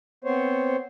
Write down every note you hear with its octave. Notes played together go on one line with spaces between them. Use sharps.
B3 C4 C5 C#5